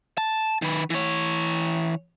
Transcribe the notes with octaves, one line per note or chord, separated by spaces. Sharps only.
A5
D#3 B4
E3 C#5